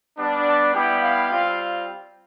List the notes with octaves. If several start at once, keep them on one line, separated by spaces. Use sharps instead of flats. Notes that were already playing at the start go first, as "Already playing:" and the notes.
G3 B3 D4
A5
G3 B3 E4 G4 G5
F5
G3 C4 F4